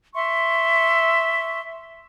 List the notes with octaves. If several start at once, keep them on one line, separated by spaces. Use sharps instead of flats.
E5 C6 C#6